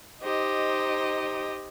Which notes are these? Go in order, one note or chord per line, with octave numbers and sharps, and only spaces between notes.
D#4 G4 C5 D#5